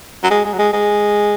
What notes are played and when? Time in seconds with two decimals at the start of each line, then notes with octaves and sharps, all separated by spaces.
0.24 F#3
0.30 G#3
0.45 G#3
0.53 F#3
0.59 G#3
0.73 G#3